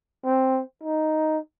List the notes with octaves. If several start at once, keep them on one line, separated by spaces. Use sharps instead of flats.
C4
D#4